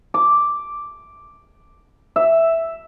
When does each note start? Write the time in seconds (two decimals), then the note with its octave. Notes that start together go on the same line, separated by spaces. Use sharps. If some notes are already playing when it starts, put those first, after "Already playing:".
0.14 D6
2.16 E5